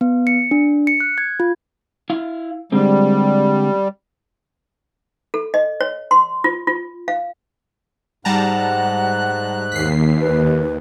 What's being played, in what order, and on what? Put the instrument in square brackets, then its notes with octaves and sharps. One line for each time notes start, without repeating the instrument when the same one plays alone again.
[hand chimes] B3
C#7
D4
C#7
F#6
G#6
F4
[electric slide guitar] E4 F5
[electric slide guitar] D3 G#3 C4 [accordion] G3
[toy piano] A4
D#5
C#5
C6
F4
F4
F5
[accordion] G#2 F#6 [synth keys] G3 A5 A#5 [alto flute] F#5
[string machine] D#2 [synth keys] B6 C7
[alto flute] B4